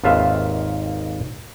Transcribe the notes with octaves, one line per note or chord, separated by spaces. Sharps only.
G#1 D#2 F4 B4 E5 F5